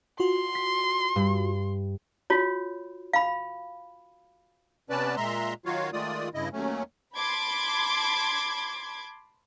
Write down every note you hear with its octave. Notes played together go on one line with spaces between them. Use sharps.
F4 F#4 C6
B6
G2
F4 F#4 C#5
F5 B5
C3 B3 C#4 B4 D5 A5
A#2 G#3 E5 A#5 C6
D#3 F#3 F4 F#4 C#5 F5
D#3 G#3 A3 F4 D5 D#6
G2 C#3 E4 D#5
D#2 F#3 A3 C#4
A5 B5 C6 D6 G#6